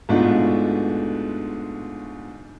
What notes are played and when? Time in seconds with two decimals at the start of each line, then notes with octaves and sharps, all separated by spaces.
0.09 G#2 B2 A3 D4 F4 F#4